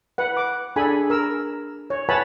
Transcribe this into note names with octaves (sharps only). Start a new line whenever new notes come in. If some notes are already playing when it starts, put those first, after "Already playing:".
B4 F#5
D6
D4 G#4 A4 G#5 B5
A#4 E6
C#5
B4 C#5 F#5 G#5 A5 B5